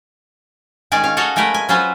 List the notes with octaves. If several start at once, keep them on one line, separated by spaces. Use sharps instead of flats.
D#3 G#3 C#4 D5 G#5
C#4 F5
F#4 A4 C#5 D#5 F5 F#5
G#3 A3 G4 A#4 B4
G#5
F#3 C#4 F4 B4 C5